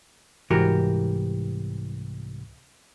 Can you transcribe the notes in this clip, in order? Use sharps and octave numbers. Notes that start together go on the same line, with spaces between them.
C2 G#2 E3 F#4 G4 A#4